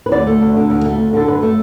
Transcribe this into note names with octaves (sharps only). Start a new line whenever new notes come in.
B4
D2 D5
A3
D2
D3
D2
A3
D2
D3 A4
F#2 B4
A3